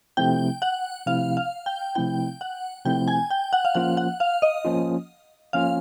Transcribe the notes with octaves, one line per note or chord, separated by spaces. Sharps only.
C3 F3 A3 C4 E4 G5
F#5
C3 F3 A3 C4 E4 F5
F5
G5
C3 F3 A3 C4 E4 G5
F#5
C3 F3 A3 C4 E4 G5
G#5
G5
F#5
F5
F3 A#3 C#4 F4 F#5
F#5
F5
D#5
F3 A#3 C#4 F4
F3 A#3 C#4 F4 F5